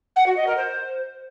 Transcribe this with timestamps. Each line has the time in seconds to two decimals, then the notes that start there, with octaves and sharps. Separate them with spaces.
0.16 F#5
0.26 F#4
0.36 D#5
0.46 A#4
0.57 C5